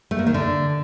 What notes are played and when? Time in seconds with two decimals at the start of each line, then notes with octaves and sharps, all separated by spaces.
0.11 A3
0.19 A#3
0.27 D#3
0.34 D3